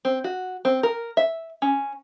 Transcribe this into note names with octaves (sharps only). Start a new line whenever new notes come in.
C4
F#4
C4
A#4
E5
C#4